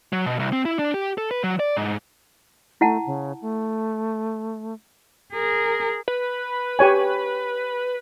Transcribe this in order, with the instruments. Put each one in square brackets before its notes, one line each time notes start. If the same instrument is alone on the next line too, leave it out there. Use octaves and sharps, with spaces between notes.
[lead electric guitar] F#3
B2
C2
C4
E4
D4
G4
A4
B4
F#3
D5
G#2
[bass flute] A3 [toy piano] E4 F#5 A5
[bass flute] C#3
A3
[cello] G#4 A#4
[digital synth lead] B4
[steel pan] G4 C#5 G#5